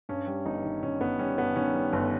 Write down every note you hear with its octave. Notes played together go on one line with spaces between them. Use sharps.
G2 C#4
G3
G1 D#4
D#3
D#3 C#4
G1 B3
G3 C#4
G2 B3
D#3 C#4
G3
G1